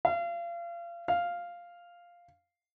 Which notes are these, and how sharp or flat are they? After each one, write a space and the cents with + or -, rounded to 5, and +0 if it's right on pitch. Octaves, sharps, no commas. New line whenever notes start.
F5 -30
F5 +0